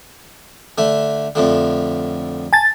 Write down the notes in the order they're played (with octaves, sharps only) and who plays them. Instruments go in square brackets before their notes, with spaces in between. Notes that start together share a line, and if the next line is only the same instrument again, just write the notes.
[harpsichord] D3 A3
F2 A2 D3
[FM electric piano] G#5 A5 A6